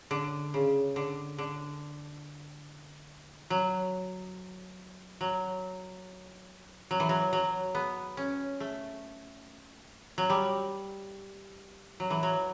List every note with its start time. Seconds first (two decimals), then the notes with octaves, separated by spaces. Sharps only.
0.11 D3
0.54 C#3
0.96 D3
1.38 D3
3.50 F#3
5.21 F#3
6.91 F#3
7.00 E3
7.09 F#3
7.33 F#3
7.75 B3
8.17 C#4
8.60 A3
10.18 F#3
10.30 G3
12.00 F#3
12.10 E3
12.23 F#3